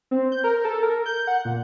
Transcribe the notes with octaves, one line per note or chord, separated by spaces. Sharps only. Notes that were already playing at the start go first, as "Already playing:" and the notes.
C4
G6
A#4
A4
A#4
G6
F#5
A#2